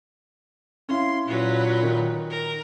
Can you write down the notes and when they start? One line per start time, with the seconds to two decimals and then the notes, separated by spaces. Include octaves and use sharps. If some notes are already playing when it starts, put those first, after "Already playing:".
0.89 C#4 E4 F5 C6
1.27 A#2 F#3 B4
1.83 D#3
2.30 A#4